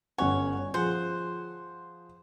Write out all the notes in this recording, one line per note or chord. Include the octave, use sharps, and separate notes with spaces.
G1 C#4 C#5 F#5
F3 G#4 C5 F#5